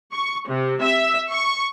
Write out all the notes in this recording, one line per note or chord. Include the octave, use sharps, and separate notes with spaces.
C#6
C3
E5
C#6